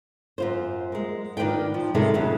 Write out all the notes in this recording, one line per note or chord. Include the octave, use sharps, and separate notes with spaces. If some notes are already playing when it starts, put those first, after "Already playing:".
F#2 F4 C5
G#3 A#3
D#3 D4 F4 B4 G5
F3
C3 D#3 G#3 E4 F4 A4
F2 C#3 F#3